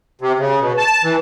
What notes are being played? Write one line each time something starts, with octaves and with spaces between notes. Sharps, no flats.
C3
C#3
B2
A5
E3